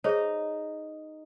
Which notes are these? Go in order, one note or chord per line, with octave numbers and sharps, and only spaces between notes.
D#4 G#4 C5 C#5 D#5